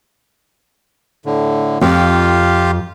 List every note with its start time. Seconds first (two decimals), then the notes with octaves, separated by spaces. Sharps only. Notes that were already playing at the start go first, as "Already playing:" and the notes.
1.26 A2 D3
1.81 F2 F4 G4 F5